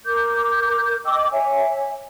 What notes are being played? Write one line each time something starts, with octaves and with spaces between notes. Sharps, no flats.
A#4 D6 G6
D#5 G5 D6 E6
C#5 E5 G#5